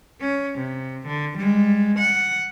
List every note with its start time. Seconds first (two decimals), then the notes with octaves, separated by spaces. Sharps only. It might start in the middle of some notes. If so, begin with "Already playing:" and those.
0.21 C#4
0.58 C3
1.07 D3
1.37 G3 G#3
1.99 F#5